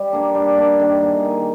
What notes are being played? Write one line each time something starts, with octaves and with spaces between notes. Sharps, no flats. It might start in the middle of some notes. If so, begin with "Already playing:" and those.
Already playing: G3
A#3 D4
G3
A#3 D4
D#3
A#3 D#4 G#4
D#3